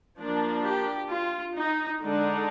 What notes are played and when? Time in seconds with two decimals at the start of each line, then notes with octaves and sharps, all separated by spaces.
0.19 F3 A#3 D4
0.65 G4
1.11 F4
1.57 D#4
2.04 D3 G#3 D4 D#4